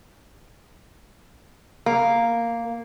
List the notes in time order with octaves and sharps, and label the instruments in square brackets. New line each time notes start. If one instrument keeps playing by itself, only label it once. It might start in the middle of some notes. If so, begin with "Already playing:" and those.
[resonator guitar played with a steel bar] A#3